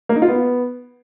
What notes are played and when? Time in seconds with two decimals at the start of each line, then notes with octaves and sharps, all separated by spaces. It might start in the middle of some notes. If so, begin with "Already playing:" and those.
0.09 A#3
0.16 D#4
0.22 F4
0.28 B3